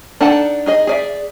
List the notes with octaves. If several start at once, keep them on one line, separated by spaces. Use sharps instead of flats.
D4 D#4 A4 F#5 A5
D#4 G#4 D#5
G#4 D5 E5